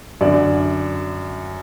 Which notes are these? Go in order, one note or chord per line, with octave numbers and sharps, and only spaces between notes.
F#2 D3 D5